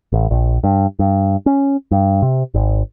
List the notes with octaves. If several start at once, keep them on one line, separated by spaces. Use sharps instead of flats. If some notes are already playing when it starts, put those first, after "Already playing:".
A1
A#1
G2
G2
C#4
G2
C3
G#1